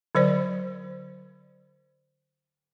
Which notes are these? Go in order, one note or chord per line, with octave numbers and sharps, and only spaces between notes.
D3 F#3 C5 D5